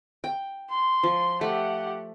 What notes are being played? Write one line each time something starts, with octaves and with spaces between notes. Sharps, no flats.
G5
C6
F3
A3 G4 F#5